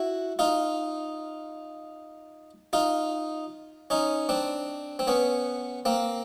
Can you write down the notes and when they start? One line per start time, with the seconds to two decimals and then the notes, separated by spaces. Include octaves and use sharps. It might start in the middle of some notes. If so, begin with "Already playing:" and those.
Already playing: E4 F#4
0.39 D#4 F4
2.73 D#4 F4
3.90 C#4 D#4
4.29 C4 D4
4.99 C4
5.07 B3 C#4
5.85 A#3 C4